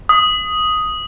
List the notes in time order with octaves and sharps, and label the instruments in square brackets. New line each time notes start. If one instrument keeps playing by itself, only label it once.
[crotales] D#6